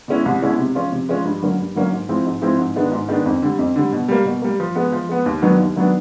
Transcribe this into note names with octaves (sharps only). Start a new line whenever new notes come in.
B2 G#3 C#4 E4
C2
B2 G#3 C#4 E4
C3
F3 G#3 C#4 F4
C3
F3 G#3 C#4 F4
G2
D3 F#3 A#3 C#4
G2
D3 F#3 A#3 C#4
G#2
F3 G#3 C4 E4
G#2
F3 G#3 C4 E4
G#2
D#3 G#3 B3 D4
G#2
D#3 G#3 B3 D4
F2
D3 G3
F2
D3 G3
B2
G3 A#3
B2
G3 A#3
F3
G#3 B3
F3
G#3 B3
D#2
D#3 F#3 B3 D4
D#2
D#3 F#3 B3 D4